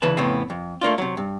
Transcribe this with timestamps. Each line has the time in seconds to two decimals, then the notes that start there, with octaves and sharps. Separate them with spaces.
0.02 D2 C#3 E3 B4 A5
0.17 F2 A2 C#3 B3 C4
0.50 F2
0.81 A3 A#3 D4 F4
0.98 C3 F#3
1.17 G2